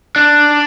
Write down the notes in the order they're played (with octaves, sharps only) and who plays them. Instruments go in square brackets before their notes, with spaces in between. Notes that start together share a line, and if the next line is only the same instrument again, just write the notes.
[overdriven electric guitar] D4